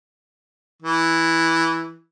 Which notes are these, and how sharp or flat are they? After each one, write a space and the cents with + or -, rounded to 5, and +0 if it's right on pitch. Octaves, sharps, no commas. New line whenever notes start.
E3 -5